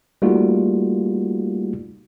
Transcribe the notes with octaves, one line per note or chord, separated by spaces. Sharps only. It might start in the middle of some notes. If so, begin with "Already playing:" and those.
G3 A3 A#3 D#4 F4 F#4